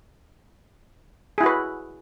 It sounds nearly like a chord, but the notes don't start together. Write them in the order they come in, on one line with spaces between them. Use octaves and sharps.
G#4 E4 F#4 B4